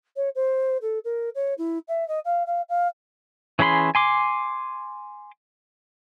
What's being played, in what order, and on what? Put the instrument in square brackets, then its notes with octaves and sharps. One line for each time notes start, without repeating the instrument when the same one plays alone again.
[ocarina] C#5
C5
A4
A#4
C#5
E4
E5
D#5
F5
F5
F5
[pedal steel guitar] E3 C#4 G#4 B5 C6
G#5 C6 D6